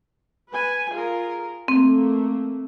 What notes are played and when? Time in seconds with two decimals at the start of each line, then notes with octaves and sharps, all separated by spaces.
0.51 B4 G#5
0.92 F4 G#4 A#4
1.68 A3 A#3 C4